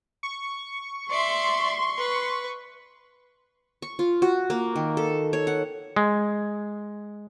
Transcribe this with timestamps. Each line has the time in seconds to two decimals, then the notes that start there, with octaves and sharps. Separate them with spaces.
0.23 C#6
1.10 D5 E5 C6
1.98 B4
3.82 C#6
3.99 F4
4.22 F#4
4.50 A#3
4.75 D#3
4.97 A4
5.33 C#5
5.47 F#5
5.96 G#3